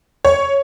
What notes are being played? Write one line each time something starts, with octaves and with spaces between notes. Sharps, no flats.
C#5